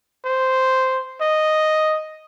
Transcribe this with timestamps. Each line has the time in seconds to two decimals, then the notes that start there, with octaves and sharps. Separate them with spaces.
0.25 C5
1.21 D#5